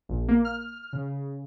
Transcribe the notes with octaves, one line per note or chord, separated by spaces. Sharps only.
A#1
A#3
F6
C#3